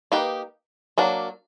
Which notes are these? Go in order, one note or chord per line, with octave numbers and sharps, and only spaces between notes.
A#3 D#4 G4 B4
F#3 A#3 D4